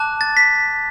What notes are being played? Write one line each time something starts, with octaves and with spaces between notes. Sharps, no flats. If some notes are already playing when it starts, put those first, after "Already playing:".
Already playing: A5 D6 F#6
A6
B6